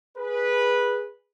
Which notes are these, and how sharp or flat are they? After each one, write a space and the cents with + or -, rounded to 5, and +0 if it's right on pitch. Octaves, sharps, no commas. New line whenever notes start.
G#4 -5 B4 -10